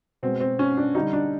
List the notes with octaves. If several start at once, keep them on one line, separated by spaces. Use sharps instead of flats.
B2 G#3 C4
C4
C#4
D4
D3 G3 D#4
D4